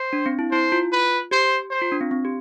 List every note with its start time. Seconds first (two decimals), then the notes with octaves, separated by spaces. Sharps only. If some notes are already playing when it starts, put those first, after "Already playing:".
Already playing: C5
0.13 D4
0.26 C4
0.39 E4
0.52 E4 C5
0.72 F4
0.92 B4
1.31 G4 C5
1.71 C5
1.82 F4
1.92 D4
2.01 C4
2.11 C4
2.25 G4